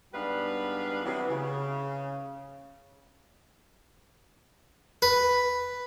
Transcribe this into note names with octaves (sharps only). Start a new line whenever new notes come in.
G#2 G3 B3 D4 B4 F5
C3 E3 F#3 B3
C#3
B4